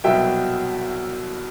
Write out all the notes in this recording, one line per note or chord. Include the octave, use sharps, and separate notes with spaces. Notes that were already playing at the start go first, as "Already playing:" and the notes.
C2 B2 F#3 E5 G5